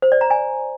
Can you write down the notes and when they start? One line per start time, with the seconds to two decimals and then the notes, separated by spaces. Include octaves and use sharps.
0.02 C5
0.12 D5
0.21 A#5
0.30 G#5